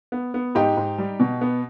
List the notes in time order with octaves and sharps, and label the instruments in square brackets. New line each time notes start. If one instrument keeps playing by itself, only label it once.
[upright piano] B3
B3
G#2 D#4 G4
G#2
G3
B2
B3